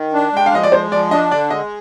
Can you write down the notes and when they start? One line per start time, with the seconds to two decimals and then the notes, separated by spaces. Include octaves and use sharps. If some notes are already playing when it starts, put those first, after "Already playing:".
Already playing: D#3
0.13 D4
0.33 G#3 G5
0.46 F5
0.52 F3 D#5
0.63 D5
0.72 G#3 C5
0.92 F3 D5
1.11 D4 D#5
1.31 D3 D5
1.50 G#3 D#5